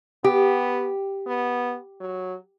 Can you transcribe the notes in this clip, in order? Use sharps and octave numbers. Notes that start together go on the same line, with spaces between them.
B3 G4
B3
F#3